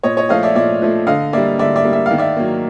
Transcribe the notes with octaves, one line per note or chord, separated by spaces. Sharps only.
A#2 C#5 D#5
C#5 D#5
F3 A3 D#5 F5
D5 E5
A#2 D5 E5
F3 A3
D3 D#5 F5
G3 A#3 D5 E5
D3 D5 E5
D5 E5
G3 A#3
E5
D#3 F5
D5 E5
F#3 A#3